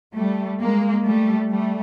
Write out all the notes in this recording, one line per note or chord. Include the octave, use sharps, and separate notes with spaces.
G3 A3
G#3 A#3
G3 A3
G3 A3